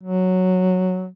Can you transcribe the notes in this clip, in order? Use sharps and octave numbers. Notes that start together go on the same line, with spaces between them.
F#3